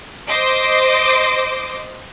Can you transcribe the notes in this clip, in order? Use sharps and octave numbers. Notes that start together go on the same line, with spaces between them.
C5 D#5 D6